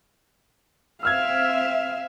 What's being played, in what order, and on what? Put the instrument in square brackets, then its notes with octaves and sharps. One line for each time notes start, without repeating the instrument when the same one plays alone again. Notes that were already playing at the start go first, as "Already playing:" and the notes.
[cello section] C4 E5 [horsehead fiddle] F5 [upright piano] E6 F6 G#6